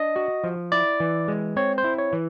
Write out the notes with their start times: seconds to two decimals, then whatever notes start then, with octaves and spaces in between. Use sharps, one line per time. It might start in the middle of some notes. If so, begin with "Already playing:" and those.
Already playing: D4 D#5
0.16 F#4
0.44 F3
0.72 E4 D5
1.00 E3
1.28 G#3
1.56 C4 C#5
1.78 C5
1.84 E4
1.99 C#5
2.13 E3